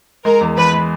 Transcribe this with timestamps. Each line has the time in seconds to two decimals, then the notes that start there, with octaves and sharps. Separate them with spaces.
0.25 G#3 A#4
0.41 E2
0.57 E2 B4
0.73 G#3